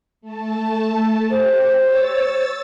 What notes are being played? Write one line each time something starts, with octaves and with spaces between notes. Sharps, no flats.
A3 A5
G4 C5
C#5 E6 A6